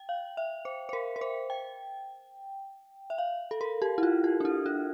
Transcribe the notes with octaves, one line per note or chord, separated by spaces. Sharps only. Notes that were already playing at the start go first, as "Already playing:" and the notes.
Already playing: G5
F5
E5
C5
C5
A#4
A#4
C5
G5
E5
F5
A4
A#4
G4
E4
F4
G4
D4
E4
F4